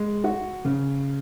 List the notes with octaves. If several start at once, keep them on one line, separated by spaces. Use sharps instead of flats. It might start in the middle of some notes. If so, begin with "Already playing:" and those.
Already playing: G#3
F#4
C#3